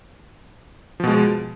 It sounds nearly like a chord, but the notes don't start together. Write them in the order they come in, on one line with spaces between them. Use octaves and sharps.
F3 B2 G#3